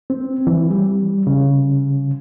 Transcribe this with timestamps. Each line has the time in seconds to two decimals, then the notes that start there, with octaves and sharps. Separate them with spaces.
0.10 C4
0.47 E3
0.70 G3
1.27 C#3